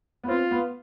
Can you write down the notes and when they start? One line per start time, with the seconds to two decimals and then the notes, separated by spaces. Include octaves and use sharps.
0.24 B3
0.28 C4 F4
0.51 B3